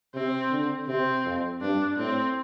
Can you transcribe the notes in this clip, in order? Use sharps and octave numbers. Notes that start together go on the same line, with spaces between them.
C3 C4
D3
C3 C4
F2
G2 D4
A2 C4